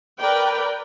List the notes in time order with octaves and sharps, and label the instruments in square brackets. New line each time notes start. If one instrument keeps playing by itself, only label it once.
[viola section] A#4 B4 D5 G5